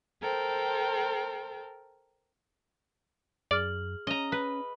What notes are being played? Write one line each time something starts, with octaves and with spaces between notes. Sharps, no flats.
A4 A#4 C5 G5
F#2 G#4 D5 F6 F#7
C#4 D#5 A#5
B4